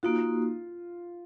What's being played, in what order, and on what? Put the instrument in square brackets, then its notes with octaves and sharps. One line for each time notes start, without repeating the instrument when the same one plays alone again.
[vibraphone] A#3 D#4 F#4 [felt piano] F4